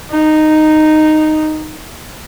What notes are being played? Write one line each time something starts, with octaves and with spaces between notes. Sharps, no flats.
D#4